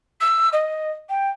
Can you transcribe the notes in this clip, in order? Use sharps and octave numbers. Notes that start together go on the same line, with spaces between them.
E6
D#5
G5